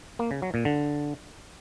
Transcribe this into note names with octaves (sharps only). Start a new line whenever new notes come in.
A#3
C#3
F#3
A#2
D3